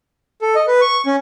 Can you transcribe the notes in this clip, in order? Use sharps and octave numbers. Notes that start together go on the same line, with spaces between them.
A4
D#5
B4
C#6
C#4